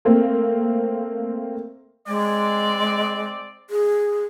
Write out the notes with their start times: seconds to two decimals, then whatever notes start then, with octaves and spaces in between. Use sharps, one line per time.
0.05 A3 A#3 C4
2.08 G#3 C4 D5
3.70 G#4